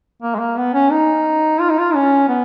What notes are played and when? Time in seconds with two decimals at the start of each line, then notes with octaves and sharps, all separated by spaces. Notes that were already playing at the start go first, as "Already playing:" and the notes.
0.22 A#3
0.35 G#3
0.39 A#3
0.57 B3
0.74 C#4
0.91 D#4
1.60 F4
1.70 D#4
1.78 F4
1.95 C#4
2.29 B3